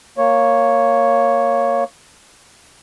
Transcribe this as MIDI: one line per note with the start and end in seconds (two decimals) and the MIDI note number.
0.18 1.84 58
0.18 1.84 73